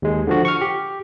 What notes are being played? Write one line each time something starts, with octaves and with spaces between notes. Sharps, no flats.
D#2 G#3
D3 F3 F#4
C#6 F6
G4